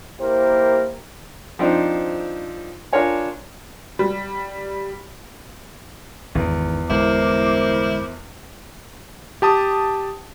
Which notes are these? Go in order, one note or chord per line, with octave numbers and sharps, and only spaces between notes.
A#3 E4 G4 A#4 C5
F3 C4 D4 D#4
D4 F4 A#4 C#5 G#5
G3
G#1 E2 D#3
G1 G#3 B3 E4 A#4 C5 D6
G4 A5 D#6